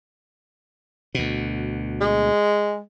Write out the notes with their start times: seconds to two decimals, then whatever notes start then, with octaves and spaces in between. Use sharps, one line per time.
1.15 D2 B2
2.01 G#3